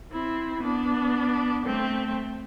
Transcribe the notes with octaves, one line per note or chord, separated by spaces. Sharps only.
C4 E4
B3 D4
A3 C4